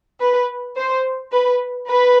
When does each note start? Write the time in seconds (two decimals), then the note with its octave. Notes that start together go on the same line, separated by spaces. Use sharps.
0.21 B4
0.77 C5
1.32 B4
1.88 B4